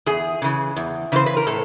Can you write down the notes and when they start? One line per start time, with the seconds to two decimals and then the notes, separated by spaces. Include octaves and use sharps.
0.06 E2 G#4
0.42 C#3 E3
0.76 E2
1.12 C#3 E3 C5
1.26 B4
1.37 A#4
1.47 A2 A4